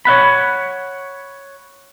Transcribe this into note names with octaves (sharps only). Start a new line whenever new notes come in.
C#5 E5 F#5 B5